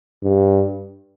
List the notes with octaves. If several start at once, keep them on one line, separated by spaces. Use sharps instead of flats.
G2